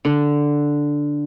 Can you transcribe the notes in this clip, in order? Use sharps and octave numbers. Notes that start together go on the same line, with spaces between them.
D3